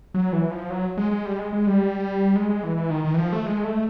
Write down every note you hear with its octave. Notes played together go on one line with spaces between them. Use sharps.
F#3
E3
F3
F#3
G#3
G#3
G3
G#3
G#3
G3
G#3
G#3
E3
E3
D#3
D#3
E3
F3
A3
G#3
A3